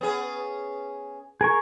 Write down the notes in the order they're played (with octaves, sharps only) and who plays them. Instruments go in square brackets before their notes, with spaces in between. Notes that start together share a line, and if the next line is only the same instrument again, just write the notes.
[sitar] B3 C#4 G#4
[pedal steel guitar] G#4 A#4 C#6